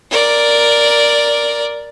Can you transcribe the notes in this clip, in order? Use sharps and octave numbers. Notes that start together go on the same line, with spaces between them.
A#4 D5